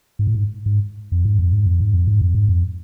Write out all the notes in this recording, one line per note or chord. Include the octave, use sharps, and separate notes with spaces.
G#2
A2
G#2
G#2
F2
G#2
F2
G#2
F2
G#2
F2
G#2
F2
G#2
F2